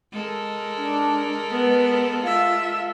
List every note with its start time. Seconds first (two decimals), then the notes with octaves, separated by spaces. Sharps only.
0.12 G#3 A4 A#4
0.77 D4
1.50 B3 B4
2.22 F4 E5 F5